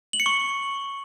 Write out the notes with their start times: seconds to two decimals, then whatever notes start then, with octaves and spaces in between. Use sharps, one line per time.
0.13 F#7
0.20 C#7
0.26 C#6